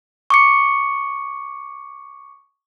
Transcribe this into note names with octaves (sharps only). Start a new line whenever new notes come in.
C#6 D6 C#7